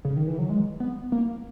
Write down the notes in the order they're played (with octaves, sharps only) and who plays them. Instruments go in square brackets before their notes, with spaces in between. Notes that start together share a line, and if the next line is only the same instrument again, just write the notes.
[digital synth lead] C#3
D#3
E3
F#3
G#3
B3
A#3